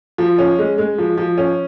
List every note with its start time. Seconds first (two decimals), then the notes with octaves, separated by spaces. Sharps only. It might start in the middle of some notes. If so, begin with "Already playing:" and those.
0.18 F3
0.38 C#4
0.59 G#3
0.78 G#3
0.98 F3
1.17 F3
1.38 C#4